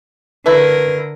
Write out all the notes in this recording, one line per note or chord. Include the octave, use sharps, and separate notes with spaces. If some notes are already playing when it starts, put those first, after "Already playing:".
D3 A3 E4 A#4 B4